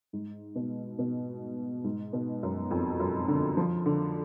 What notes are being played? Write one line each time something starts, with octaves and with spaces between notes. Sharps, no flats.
G#2
B2
B2
G#2
B2
F#2
F2
F#2
D3
F3
D3